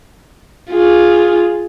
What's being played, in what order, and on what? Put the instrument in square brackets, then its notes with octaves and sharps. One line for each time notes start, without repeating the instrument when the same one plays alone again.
[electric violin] F4 G#4